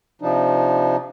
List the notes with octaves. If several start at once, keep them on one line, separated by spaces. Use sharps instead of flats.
C3 F3 D4 D#4